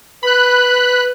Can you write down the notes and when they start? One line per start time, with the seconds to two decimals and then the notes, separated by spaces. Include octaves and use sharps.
0.23 B4 B5 F#6